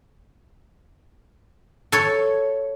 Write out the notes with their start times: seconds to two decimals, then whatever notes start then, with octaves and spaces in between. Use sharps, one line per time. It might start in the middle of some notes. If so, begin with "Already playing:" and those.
1.92 A4 C#5